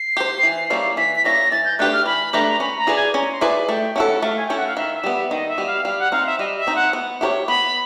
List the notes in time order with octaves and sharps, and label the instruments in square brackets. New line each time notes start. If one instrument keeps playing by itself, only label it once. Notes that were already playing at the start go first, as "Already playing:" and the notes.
Already playing: [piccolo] C7
[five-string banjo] G4 C5
E3
G3 A#3 C#4 E4
[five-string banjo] E3 [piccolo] B6
[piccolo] B6
[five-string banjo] G3 A#3 C#4 E4 [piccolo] A#6
[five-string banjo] E3 [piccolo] A6
[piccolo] G6
[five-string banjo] A3 D4 G4 B4 [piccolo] F#6
[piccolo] F6
[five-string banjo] E3 [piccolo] B5
[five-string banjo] A3 D4 G4 B4 [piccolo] A#5
[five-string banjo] C#4 [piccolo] B5
[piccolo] A#5
[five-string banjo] E4 G#4 B4 D5
[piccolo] G#5
[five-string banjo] C#4 [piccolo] A#5
[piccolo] C6
[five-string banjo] E4 G#4 B4 D5
[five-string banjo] A3 [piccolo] G5
[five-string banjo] C#4 E4 A4 [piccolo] F#5
[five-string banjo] A3 [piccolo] F5
[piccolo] G#5
[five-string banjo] C#4 E4 A4 [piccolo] G5
[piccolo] F#5
F5
[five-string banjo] D#3 [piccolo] E5
[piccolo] E5
[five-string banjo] G3 B3
[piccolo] E5
[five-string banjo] D#3 [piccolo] D#5
[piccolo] E5
[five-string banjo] G3 B3
[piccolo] F5
[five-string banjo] G3 [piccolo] F5
[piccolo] F#5
[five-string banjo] C4 D#4 [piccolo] F5
[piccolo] E5
[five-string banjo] G3 [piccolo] D#5
[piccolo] E5
[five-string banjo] C4 D#4
[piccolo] F#5
[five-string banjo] B3
E4 G4 A#4 C#5
[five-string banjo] B3 [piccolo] B5